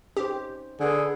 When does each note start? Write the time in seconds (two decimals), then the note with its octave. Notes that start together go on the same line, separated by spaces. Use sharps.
0.17 C#4 D#4 G4 C5
0.80 D3 D4 G#4 B4